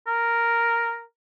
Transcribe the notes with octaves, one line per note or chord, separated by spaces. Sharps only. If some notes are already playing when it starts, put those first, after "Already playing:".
A#4